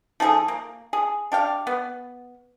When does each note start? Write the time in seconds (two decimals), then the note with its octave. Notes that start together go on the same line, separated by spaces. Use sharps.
0.20 F3 D#4 G#4 A4
0.48 A#3
0.93 G#4
1.32 D4 G4 F5
1.67 B3